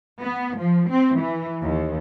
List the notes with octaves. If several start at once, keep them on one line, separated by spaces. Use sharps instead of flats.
B3
F3
C4
E3
D#2